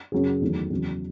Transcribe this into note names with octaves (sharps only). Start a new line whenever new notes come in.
F#2 C#3 F#3 C#4 G#4
E2 D#3 F#3 A3
E2 C#3 F#3